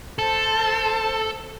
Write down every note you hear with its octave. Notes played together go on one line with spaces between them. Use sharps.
A4 C5 A5